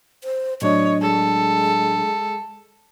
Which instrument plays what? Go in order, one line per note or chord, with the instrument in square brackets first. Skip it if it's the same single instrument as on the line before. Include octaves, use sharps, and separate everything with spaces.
[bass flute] C5
[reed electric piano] A2 F#3 D4 [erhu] C#5 [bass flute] D#5
[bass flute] G#3 [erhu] A4